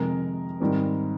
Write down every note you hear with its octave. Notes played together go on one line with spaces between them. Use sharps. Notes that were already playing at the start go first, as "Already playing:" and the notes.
Already playing: F2 C3 D#3 G#3 A#4
G#2 D#3 G3 C4